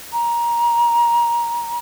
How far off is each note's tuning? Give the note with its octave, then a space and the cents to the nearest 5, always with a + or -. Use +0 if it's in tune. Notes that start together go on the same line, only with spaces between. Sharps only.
A#5 +15